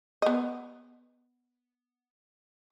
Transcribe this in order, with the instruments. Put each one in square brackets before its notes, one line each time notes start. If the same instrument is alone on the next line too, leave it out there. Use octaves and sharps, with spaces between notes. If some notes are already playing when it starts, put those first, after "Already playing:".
[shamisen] B3 D#5